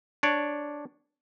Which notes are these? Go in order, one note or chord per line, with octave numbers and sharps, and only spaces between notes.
D4 C#5 D5